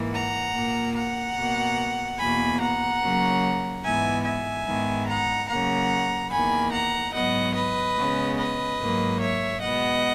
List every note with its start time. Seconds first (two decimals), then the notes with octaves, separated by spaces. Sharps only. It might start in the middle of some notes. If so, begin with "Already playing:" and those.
Already playing: G#2 E3 A#3
0.12 F#5 A#5
0.53 A#2 A#3
0.95 F#5 A#5
1.35 B2 A#3
2.18 E2 B2 A#3 G#5 B5
2.60 F#5 A#5
3.01 C#3 F#3 A#3
3.83 G#2 E3 G#3 B3 E5 G#5
4.24 E5 G#5
4.66 G#2 D#3 G#3 B3
5.07 F#5 A#5
5.48 C#3 F#3 A#3 F#5 A#5
6.31 E2 D#3 A#3 G#5 B5
6.72 F#5 A#5
7.13 G#2 F#3 B3 D#5 F#5
7.55 B4 D#5
7.96 C#3 G#3 B3
8.38 B4 D#5
8.79 G#2 F#3 A#3
9.21 C#5 E5
9.61 B2 G#3 B3 D#5 F#5